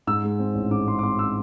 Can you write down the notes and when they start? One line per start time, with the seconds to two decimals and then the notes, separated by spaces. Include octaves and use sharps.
0.07 G#2 E6
0.23 G#3
0.39 C4
0.55 A1
0.71 G#2 D6
0.87 G#3 C6
0.99 D6
1.03 C4 C6
1.19 E6